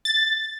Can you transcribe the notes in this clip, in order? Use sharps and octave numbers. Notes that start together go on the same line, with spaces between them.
A6